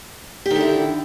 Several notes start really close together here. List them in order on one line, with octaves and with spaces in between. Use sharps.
G4 D#3 D3 E4